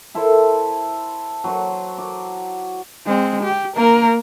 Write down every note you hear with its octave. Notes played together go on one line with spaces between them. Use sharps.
E4 A4 A#4 C5
F#3 C5 C#6
D6
G#3 C4
G4
A#3 A#4